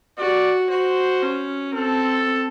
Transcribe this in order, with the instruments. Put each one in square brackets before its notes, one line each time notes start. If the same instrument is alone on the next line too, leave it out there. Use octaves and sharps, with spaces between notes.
[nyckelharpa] F#4 [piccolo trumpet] D5
[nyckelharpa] F#4 [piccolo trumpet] C5
[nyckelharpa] C#4
[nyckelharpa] C4 [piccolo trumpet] A4